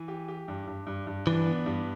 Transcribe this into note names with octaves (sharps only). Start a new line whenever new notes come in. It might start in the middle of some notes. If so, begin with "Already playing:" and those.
Already playing: E3
G4
G4
G2
G2
G2
G2
E3 D4
B3
G2